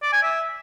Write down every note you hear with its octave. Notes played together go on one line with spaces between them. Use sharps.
D5
G#5
E5